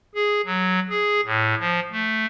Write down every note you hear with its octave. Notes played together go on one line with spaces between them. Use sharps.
G#4
F#3
G#4
A2
F3
A3